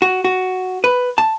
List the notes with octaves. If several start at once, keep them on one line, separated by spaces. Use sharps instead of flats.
F#4
F#4
B4
A5